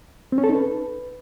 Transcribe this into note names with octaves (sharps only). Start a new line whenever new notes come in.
C4
C#4
A4
D#4
B4